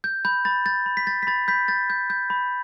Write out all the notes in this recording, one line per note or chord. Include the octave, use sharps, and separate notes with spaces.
G6
B5 G6
B5 A6
G6 A6
B5
B6
G6 A6
B6
B5 A6
B5 G6 B6
G6 A6
G6
G6
B5